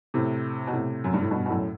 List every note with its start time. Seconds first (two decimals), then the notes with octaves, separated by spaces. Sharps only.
0.14 A2 C3
0.67 B2
0.73 A2 C3
1.04 F#2
1.14 G2
1.22 A2
1.31 G2 B2
1.46 B2
1.50 F#2 A2